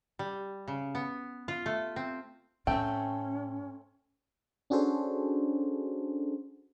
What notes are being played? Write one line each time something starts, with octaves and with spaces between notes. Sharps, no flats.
G3
C#3
B3
F4
A3
C4
A2 A3 C4 C#4 G5
C#4 D4 F#4 G#4 A4 C5